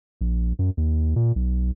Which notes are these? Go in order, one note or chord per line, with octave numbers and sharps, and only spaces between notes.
A#1
F#2
D#2
A#2
B1